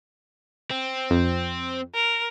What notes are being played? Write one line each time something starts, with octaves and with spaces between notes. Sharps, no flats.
C4
F2
A#4